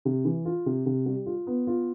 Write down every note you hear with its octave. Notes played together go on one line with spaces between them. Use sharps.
C3
E3
F4
C3
C3
G3
F4
B3
F4